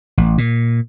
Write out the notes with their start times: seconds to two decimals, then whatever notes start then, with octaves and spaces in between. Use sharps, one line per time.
0.17 A1
0.38 A#2